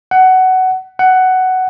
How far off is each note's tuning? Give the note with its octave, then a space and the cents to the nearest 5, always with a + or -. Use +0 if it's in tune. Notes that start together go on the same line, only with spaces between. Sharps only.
F#5 +15
F#5 +10